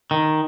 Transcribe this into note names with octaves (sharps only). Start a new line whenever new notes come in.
D#3